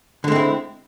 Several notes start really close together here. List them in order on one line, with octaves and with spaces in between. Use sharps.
D3 G#3 C4 E4